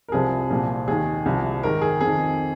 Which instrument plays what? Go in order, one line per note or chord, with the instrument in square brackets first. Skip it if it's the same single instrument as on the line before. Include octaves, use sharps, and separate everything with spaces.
[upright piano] A#4
C2 C3 F3 G#4
C2 A#2 F3
D#2 D#3 G#4
C2 C3 F3
G#2 D#3 A#4
G#4
F2 D#3 G#4